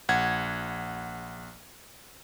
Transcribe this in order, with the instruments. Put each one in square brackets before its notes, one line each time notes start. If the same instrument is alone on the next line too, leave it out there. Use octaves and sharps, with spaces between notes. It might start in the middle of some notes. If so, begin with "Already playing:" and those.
[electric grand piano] A#1 F#5 G#6